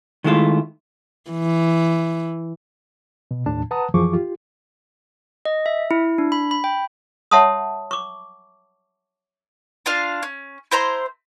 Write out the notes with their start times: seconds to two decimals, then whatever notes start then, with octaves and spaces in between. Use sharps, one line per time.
0.24 D#3 G#3 A3 E4 F4
1.30 E3
3.31 B2
3.46 D#2 A2 D4 A5
3.71 B4 F#5 A5 A#5 D#6
3.94 F#2 E3 F3 G#4 C#6 D6
4.13 F4 G4
5.45 D#5
5.66 E5
5.91 E4
6.18 D4
6.32 B5
6.51 B5
6.64 G5
7.31 C#5 E5 F#5 A5 C6 D#6
7.91 C#6 D6
9.86 D4 F4 F5
10.23 C#4
10.71 E4 C5 A#5 C6